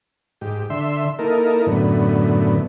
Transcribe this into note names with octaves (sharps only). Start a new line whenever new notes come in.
G#2 G4
D3 E5 C6
A#3 D#4 E4 A4 A#4
F#2 A2 D3 B3